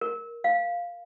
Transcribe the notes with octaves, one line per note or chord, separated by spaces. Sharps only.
A#4
F5